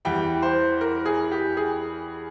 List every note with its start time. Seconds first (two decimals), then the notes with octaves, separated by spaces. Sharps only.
0.05 E2 E3 G3 G5
0.42 C5
0.81 A#4
1.06 G#4
1.32 G4
1.57 G#4